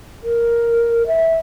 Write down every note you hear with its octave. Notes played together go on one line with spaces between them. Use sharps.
A#4
E5